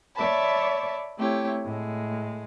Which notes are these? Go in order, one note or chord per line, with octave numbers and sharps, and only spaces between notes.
C#5 D5 E5 A5 B5
A3 C4 E4 G4 C#5
A2 G#3